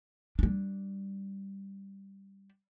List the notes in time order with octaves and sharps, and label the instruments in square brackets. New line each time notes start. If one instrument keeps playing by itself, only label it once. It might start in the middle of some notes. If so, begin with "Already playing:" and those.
[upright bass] G3 D4